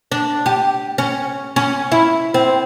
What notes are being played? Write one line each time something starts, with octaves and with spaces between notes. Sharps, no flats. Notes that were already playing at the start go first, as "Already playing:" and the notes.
D4
G4
C#4
C#4
E4
C4